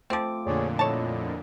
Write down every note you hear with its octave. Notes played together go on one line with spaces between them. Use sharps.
F3 A3 C4 F4 D6
F2 A#2 D3 G#4 C#5 D5
E4 A4 C#5 D#5 A5